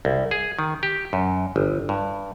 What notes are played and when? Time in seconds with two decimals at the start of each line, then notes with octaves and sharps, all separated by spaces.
0.05 C2
0.31 G#4
0.59 D#3
0.83 G4
1.13 F#2
1.56 G1
1.89 G2